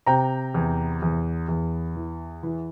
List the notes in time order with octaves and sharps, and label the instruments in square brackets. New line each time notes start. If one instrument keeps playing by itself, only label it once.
[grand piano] C3 G5 A#5
E2
E2
E2
E3
E3